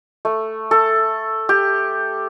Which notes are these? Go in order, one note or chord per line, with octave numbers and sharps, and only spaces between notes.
A3
A4
G4